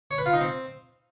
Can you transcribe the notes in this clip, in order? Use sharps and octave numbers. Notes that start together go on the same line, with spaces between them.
C#5
B4
F4
D#4
C4